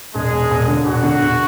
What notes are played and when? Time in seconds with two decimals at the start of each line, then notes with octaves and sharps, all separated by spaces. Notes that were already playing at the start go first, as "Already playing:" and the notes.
0.14 E1 G#3 G#4
0.32 E1
0.50 E1
0.68 D3
0.85 E1 F#4
1.03 D3
1.21 E1